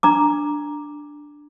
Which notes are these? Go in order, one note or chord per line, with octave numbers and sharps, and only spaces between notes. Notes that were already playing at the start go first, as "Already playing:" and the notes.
D4 A#5 D6